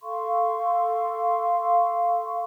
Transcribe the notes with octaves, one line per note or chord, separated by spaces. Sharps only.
A4 F5 C6 C#6